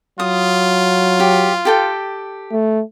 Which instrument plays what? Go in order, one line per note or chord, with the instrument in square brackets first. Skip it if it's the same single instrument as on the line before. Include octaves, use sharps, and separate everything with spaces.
[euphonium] F#3 [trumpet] F4 [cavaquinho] D#6
[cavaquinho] G4
G4 A4 G5
[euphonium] A3